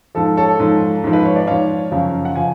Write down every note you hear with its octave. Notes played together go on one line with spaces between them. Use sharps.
G#2 F3 A4
A4 C#5
G#2 F3
G#2 F3
B4
C#5
D5
G#2 F3 C#5 F5
F#2 C#3 F3
F#5
C#3 F3 F5 G#5